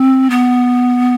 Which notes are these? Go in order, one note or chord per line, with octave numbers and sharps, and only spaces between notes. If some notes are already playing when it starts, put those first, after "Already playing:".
Already playing: C4
B3